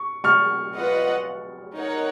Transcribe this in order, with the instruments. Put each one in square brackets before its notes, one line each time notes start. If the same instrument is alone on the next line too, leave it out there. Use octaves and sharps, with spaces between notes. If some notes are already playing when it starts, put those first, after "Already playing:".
Already playing: [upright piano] C#6
C#6 F6
[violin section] F4 B4 D#5 F#5
D#4 A#4 C#5 F#5